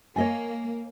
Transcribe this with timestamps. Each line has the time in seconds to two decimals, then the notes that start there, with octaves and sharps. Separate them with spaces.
0.16 A#3 C#5 D#5 G#5